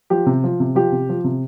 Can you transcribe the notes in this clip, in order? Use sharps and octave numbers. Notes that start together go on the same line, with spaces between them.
F3 G4
C3
F3
C3
F3 G4
C3
F3
C3